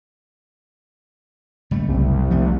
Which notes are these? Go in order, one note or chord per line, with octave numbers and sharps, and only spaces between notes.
F#1 G3 A3
C2
F3 A3 B3